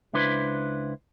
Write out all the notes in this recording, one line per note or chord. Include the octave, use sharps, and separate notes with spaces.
C#2 D4 E4 B4 C5